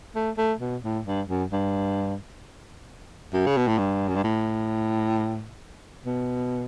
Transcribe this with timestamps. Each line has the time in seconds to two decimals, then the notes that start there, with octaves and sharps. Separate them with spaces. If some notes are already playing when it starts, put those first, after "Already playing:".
0.15 A3
0.37 A3
0.61 B2
0.84 A2
1.06 G2
1.28 F#2
1.52 G2
3.33 F#2
3.46 C#3
3.57 B2
3.68 A2
3.78 G2
4.08 F#2
4.15 G2
4.24 A2
6.06 B2